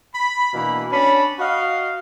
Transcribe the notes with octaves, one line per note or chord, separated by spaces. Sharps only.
B5
B2 E3 A#3 D4 B5
C#4 D4 A5 B5
F#4 D#5 F5